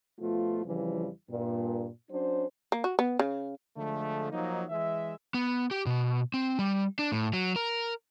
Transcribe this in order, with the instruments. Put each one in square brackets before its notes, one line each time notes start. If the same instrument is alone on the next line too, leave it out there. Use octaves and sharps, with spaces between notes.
[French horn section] B2 F3 A3 F4
F2 C#3 E3 F3 G3
G2 A#2
F#3 C#4 D4 C5
[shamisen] A#3
F#4
B3
C#3
[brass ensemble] D3 F3 G#3 A3
F3 F#3 A#3 D#4
E3 G#3 E5
[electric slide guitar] B3
G4
B2
C4
G3
D4
A2
F#3
A#4